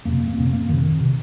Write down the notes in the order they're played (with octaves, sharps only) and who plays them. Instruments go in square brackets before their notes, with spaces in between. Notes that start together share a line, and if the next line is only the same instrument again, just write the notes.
[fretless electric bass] F2 C3 A#3
A#3
F2 C3 C4
A#3
F2 C3 D#3
C3